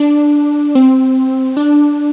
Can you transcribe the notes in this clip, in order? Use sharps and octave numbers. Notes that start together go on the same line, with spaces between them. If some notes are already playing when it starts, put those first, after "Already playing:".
Already playing: D4
C4
D4